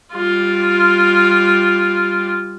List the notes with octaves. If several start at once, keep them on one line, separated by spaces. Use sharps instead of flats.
G3 F4